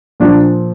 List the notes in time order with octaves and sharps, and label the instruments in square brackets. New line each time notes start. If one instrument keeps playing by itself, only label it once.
[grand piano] A#2 F3 D4